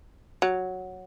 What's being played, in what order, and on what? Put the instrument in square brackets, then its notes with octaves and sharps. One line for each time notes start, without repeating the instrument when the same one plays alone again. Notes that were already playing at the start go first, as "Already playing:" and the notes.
[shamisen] F#3